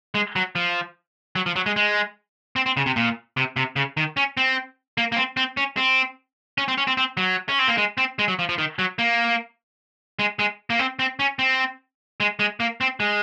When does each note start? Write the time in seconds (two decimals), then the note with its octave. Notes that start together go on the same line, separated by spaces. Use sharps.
0.15 G#3
0.36 F#3
0.56 F3
1.36 F#3
1.46 F3
1.56 F#3
1.66 G#3
1.76 G#3
2.56 C4
2.66 C4
2.77 C#3
2.86 C3
2.96 A#2
3.37 C3
3.57 C3
3.76 C#3
3.97 D#3
4.17 C#4
4.37 C4
4.98 A#3
5.12 A#3
5.16 C4
5.37 C4
5.57 C#4
5.77 C4
6.58 C#4
6.68 C4
6.78 C#4
6.87 C4
6.97 C4
7.17 F#3
7.49 C#4
7.59 C4
7.68 A#3
7.78 G#3
7.98 C4
8.19 G#3
8.28 F#3
8.39 F3
8.49 F3
8.58 D#3
8.79 F#3
8.99 A#3
10.19 G#3
10.39 G#3
10.70 A#3
10.79 C4
10.99 C4
11.19 C#4
11.39 C4
12.20 G#3
12.39 G#3
12.60 A#3
12.81 C4
13.00 G#3